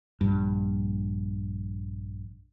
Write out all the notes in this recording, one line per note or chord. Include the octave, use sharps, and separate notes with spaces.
A#1 G2